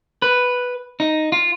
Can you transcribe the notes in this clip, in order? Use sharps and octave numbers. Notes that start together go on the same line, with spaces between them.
B4
D#4
F4